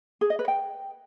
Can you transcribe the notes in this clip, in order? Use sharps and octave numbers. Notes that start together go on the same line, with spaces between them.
G#4
D#5
B4
G5